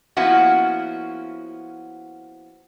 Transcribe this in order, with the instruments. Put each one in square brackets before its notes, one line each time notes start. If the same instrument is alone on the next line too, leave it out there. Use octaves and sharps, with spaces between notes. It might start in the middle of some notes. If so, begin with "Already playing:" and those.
[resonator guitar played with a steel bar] F3 A#3 B3 C#4 E4 F#4